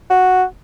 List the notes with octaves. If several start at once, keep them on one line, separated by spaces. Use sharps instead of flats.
F#4